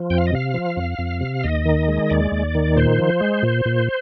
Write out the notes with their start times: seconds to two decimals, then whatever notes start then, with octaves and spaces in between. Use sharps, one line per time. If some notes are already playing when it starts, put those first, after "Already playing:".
Already playing: F3
0.10 F2 G5
0.18 F5
0.27 D#5
0.33 C3 F5
0.54 F3
0.77 F2
0.98 F2
1.21 C3
1.44 D#2 D#5
1.66 D#3
1.88 G#3
2.10 D#2 D5
2.32 D#2
2.55 D#3
2.76 A#2 C5
2.98 F3
3.21 G#3
3.43 A#2
3.65 A#2